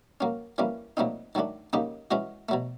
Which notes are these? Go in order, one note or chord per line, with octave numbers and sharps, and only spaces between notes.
F#3 A#3 C#4
E3 G3 A#3 C#4
A#2 F#3 A3 C4 D#4
D#3 F#3 A3 D4
C#3 F#3 A#3 D#4 G4
E3 G#3 C#4 F#4
B2 F#3 A3